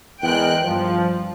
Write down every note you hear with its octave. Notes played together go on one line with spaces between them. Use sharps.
E2 G#3 A#4 G5 F#6
G2 F3